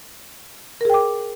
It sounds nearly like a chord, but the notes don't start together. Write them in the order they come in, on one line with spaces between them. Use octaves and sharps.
A#4 G#4 G5 D6